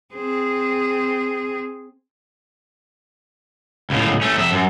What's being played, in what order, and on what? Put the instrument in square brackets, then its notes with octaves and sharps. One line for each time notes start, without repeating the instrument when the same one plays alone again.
[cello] C4 G#4
[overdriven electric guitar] C#2 A2
A3 C#4
F2 E5
F#2